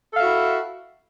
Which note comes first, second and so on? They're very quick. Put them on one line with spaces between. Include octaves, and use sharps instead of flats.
A4 F5 E5 F#4 E4